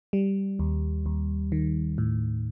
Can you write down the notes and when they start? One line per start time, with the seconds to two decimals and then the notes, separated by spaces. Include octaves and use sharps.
0.13 G3
0.59 D#2
1.06 D#2
1.52 D#3
1.98 A2